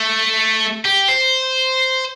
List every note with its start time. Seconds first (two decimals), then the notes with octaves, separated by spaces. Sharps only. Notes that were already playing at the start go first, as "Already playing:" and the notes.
Already playing: A3
0.85 G4
1.08 C5